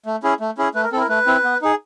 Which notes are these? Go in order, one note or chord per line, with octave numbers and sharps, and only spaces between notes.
A3
C#4 E4 G#4
A3
C#4 E4 G#4
A3 B4
A#4
C4 E4 A4 A#4
A3 B4
C4 E4
B3
D#4 G#4